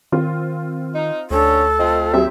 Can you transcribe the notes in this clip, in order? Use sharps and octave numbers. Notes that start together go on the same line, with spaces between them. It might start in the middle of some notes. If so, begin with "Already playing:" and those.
D#3 C4 F4
D#4
D2 D3 C#4 D4 A4
A3 C4 F4 D#5
D#2 F#3 C4 G4 E5